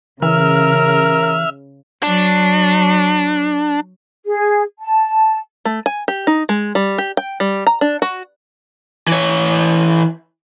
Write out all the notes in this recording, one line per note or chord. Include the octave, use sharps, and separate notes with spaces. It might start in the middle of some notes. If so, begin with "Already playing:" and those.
C#3 E3 A#4 E5 F6
F#3 D4
G#4
A5
A3
G#5
G4
D#4
G#3
G3
G4
G5
G3
A#5
D4
F#4
E3 C#5